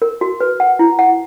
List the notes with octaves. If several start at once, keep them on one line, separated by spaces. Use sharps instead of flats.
A#4
F#4
B4
F#5
E4
F#5